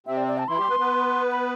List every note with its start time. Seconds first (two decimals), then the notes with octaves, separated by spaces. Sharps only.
0.06 C3 C4 E5
0.17 D5
0.28 D5
0.38 A5
0.48 E3 E4 C6
0.58 G3 G4
0.69 B3 B4
0.79 B3 B4
1.31 B5